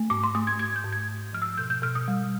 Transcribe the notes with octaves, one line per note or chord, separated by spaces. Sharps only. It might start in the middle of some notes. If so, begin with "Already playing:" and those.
Already playing: A3
G#2 D6
C6
A3 D#6
G#6
G#2 G#6
G6
G#2
G#6
G#2
F3 F6
E6
B2 G6
G6
B2 F6
D#6
G3